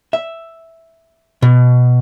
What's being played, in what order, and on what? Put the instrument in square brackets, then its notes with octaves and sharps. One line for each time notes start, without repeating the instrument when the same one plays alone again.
[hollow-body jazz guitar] E5
B2